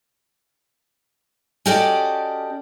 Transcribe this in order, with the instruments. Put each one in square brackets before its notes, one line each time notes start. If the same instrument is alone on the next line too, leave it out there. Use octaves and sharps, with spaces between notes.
[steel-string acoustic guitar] C#4 F#4 G4 A4 D5 D#5